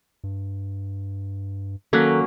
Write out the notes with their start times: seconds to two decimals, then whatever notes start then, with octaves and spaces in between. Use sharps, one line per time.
0.24 G2
1.93 D#3 F#3 A#3 C#4 A4 F#6 B6